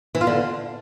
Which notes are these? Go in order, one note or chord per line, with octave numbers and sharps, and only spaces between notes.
E3
F4
D3